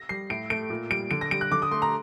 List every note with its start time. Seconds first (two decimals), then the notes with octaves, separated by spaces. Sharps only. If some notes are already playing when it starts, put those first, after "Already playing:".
Already playing: A#6
0.09 G3 C7
0.30 A2 D7
0.50 A3 D7
0.70 A#2
0.90 G3 D7
1.11 D3 D7
1.21 A#6
1.31 G3 D7
1.41 F#6
1.52 D3 D6
1.62 D#6
1.71 A3 C6
1.82 A#5